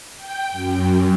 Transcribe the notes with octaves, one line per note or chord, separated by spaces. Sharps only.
G5
F#2